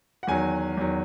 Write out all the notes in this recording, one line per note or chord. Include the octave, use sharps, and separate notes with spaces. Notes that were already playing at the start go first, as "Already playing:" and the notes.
F#5
E2 D#3 F#3 G#5
E2 D#3 F#3